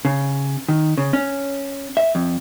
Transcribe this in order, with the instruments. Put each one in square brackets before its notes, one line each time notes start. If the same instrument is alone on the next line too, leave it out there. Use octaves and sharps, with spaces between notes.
[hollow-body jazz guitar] C#3
D#3
C#3
C#4
E5
F2